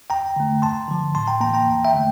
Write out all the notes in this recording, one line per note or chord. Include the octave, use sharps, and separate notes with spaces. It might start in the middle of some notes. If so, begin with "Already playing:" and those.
E2 G5 A#5
D3 A3
G2 A5 C6
D3 F3
A2 A5 C6
G5 A#5
E3 A#3 G5 A#5
G5 A#5
E2
E5 G5
D3 A3